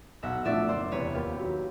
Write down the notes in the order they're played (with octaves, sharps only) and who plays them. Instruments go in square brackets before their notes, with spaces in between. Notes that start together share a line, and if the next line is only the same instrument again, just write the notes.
[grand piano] B1 [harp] E5 F#5
[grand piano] A2 F3 A3 D4 [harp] D5 E5
[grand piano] F#1 [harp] C5 D5
[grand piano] E2 C3 [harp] B4 C#5
[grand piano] D#2 [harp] F4 G4
[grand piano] D#3 F#3